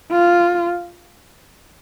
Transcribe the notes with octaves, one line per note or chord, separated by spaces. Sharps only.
F4